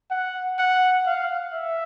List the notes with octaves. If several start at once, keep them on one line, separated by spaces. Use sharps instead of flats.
F#5
F#5
F5
E5